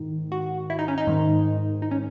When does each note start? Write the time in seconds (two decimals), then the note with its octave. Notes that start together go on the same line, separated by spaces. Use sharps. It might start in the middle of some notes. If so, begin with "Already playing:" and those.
Already playing: G#2 D#3
0.32 F#4
0.70 E4
0.79 D#4
0.88 C#4
0.98 D#4
1.07 G#2 D#3
1.82 D#4
1.91 C#4